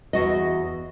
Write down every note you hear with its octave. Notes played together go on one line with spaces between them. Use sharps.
E2 F#4 D#5